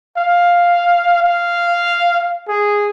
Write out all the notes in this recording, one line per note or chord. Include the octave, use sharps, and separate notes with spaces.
F5
F5
G#4